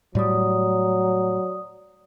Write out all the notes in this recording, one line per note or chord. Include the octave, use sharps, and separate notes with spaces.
A2 F#3 G3 D5 D#6